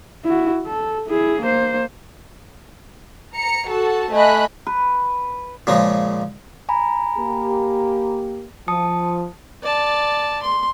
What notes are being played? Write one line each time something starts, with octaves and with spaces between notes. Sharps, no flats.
E4 F#4
A4
E4 G#4
A#3 C5
A#5 C#7
F#4 A4 A5
A3 D#5 G#5 B5 F#6
B4
A#2 C#3 F3 G#3
G#5 A#5 B5
A#3 G4
F3 A5 D#6 C#7
D5 A5
C6